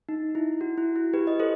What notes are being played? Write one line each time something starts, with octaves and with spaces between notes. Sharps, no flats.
D#4
E4
F#4
E4
E4
G4 B4
D#5
A4 C5